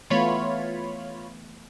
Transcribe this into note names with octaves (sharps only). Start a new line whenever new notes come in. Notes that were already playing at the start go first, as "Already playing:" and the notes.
E3 A3 B3 F4 C#5 B5